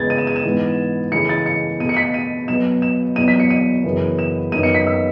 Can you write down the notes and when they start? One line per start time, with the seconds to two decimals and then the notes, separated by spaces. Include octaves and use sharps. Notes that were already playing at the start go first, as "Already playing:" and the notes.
Already playing: E2 C#3 G#3 B3 G#6 A6
0.10 D#7
0.18 E7
0.27 D#7
0.36 E7
0.45 G#2 E3 B3
1.12 C#3 E3 A3 C#7
1.29 A6
1.46 C#7
1.80 B2 D#7
1.84 A3
1.89 C#7
1.97 B6
2.14 D#7
2.48 B2 F#3 B3 E7
2.82 E7
3.16 E2 B2 F#3 B3 D#7
3.28 B6
3.40 C#7
3.50 D#7
3.84 F#2 C#3 E3 B3
4.19 E7
4.52 F#2 D#3 F#3 B3 D#7
4.63 C#7
4.75 B6
4.87 E6